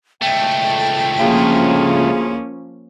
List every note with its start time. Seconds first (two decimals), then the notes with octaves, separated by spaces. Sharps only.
0.22 C#2 A3 G5
1.19 D2 F3 A#3 C#4 F4 G#4